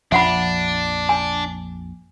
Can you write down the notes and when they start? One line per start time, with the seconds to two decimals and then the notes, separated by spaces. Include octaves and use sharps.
0.12 A#1 F2 F3 D4 E5 F#5 B5
1.09 G#5